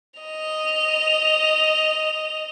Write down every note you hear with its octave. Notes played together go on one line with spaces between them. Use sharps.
D#5 F7